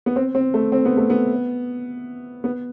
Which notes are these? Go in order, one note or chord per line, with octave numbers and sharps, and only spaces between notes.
B3
C4
C4
A3
C4
B3
A3
B3
B3